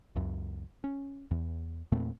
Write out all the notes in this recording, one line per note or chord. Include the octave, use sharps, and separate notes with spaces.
C#2 F#2
C#4
E2
E2 A#2 A3 C4